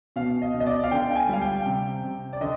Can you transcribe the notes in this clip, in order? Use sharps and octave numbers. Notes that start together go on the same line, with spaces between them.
B2 F5
D#5
B2
D#5
D5
F5
D3 G5
G#5
G3 F5
G5
C3
C3
D5
D3 D#5